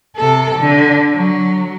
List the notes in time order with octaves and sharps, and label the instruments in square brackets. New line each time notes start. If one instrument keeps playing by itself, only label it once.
[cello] C3 A4
D3
F#3